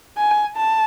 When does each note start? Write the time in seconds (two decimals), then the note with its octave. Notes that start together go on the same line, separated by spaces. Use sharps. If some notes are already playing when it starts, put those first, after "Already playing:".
0.17 G#5
0.56 A5